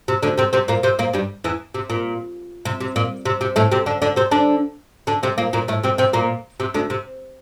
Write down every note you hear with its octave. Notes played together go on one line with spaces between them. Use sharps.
C3
D2 D3
C3 C4
C3 C4
A#2 A#3
C3 C4
A#2 A#3
G2 G3
E2 E3
C3
A#2
C3
C3
A#2
C3
C3
A2 A3
C3 C4
D3 D4
D3 D4
C3 C4
D3 D4
D3 D4
C3 C4
A#2 A#3
A#2 A#3
A2 A3
C3 C4
C3 C4
A#2 A#3
C3
D2 D3
C3